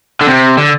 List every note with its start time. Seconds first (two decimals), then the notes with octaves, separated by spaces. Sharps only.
0.21 D3
0.27 C3
0.57 D3